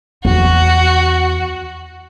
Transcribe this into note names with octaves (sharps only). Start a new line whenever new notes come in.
E2 F#4